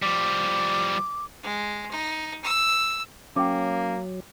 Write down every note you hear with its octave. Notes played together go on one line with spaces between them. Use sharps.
F3 G3 D6
G#3
D#4
E6
F#3 A#3 C#4 G5 D6